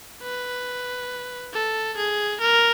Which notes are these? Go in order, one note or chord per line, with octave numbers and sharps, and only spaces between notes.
B4
A4
G#4
A#4